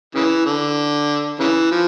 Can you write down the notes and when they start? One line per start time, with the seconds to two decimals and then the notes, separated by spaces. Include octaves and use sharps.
0.15 C#3 E3
0.46 D3
1.40 C#3 E3
1.72 F3